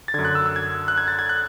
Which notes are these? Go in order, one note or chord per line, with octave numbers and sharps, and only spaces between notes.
A6
F#2 D3 G#6
F#6
E6
E6
G#6
F#6
G#6
A6
G#6
F#6